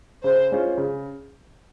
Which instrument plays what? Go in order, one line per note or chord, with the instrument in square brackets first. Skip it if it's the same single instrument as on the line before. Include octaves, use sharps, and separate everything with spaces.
[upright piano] C#3 [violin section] C5
[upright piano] G#3 C#4 F4 C5
C#3